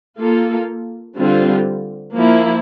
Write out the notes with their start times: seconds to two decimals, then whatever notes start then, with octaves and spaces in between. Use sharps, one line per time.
0.20 A#3 F4 A4
1.18 D3 G3 C4 F4
2.16 F3 A#3 E4